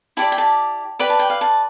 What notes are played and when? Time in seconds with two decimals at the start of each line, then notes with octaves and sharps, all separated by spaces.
0.17 E4 G4 D5 A5
0.32 G5
0.38 A5
0.99 G4 B4 D5 B5
1.10 A5
1.19 G5
1.30 F5
1.41 A5